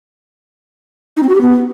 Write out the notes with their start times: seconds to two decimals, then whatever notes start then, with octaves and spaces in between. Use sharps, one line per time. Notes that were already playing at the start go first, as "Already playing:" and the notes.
1.17 D#4
1.23 C4
1.29 F#4
1.35 G4
1.41 B3